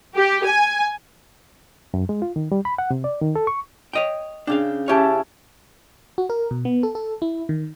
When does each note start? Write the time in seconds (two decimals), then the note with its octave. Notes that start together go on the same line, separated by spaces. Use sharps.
0.15 G4
0.45 G#5
1.94 F#2
2.09 G#3
2.22 F4
2.36 D#3
2.52 G3
2.65 B5
2.78 F#5
2.91 C3
3.04 D5
3.22 D#3
3.36 A4
3.47 C#6
3.93 C#5 D#5 G5
4.47 C#3 D4 F5 G5
4.88 C#4 E4 G4 C#5 A5
6.18 F#4
6.30 A#4
6.51 B2
6.65 B3
6.83 A4
6.95 A4
7.22 E4
7.49 D#3